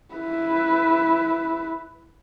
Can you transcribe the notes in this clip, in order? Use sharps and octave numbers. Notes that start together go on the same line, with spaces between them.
E4 B4